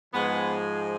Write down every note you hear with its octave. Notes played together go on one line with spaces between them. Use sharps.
G#2 F3 G#3 B3